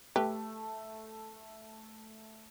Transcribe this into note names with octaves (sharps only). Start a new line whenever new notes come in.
A3 G4 B4